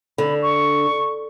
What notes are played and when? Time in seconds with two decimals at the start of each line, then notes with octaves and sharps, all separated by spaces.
0.18 D3 B5
0.42 C#6